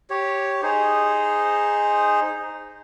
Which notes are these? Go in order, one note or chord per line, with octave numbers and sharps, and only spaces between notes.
G4 C#5
D#4 G#4 C5